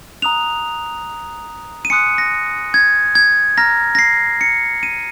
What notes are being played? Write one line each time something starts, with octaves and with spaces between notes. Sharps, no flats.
A#5 D#6 F#6 F7
D#7
G#5 C6 D#6 F#6 C#7
A#6
G#6
G#6
A#5 F6 A#6
A#6
C7
C#7
D#7